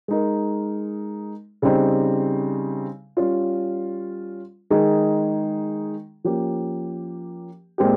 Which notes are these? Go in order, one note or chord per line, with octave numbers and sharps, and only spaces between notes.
G#3 D#4 A#4
C#3 G3 C4 D#4
G3 C#4 F4
D#3 G#3 D#4 G#4
F3 A#3 C#4 G4
A#2 G#3 C4 G4